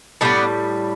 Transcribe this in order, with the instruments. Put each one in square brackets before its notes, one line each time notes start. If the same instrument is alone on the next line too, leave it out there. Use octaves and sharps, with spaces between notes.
[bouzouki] A2 G3 B3 D4